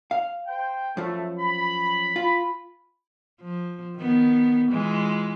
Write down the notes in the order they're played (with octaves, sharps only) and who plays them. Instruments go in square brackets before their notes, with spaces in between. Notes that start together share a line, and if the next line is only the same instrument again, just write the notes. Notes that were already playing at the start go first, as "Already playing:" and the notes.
[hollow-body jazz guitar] F5
[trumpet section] C5 G5
[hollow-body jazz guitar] F#2 F3 [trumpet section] A3
[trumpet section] B5
[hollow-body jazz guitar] F4
[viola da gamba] F3
D#3 B3
E3 G#3 F4